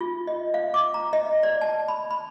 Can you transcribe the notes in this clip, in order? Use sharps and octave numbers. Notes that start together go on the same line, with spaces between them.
F4
D#5
F5
D6
A#5
D#5
D5
A5
B5
B5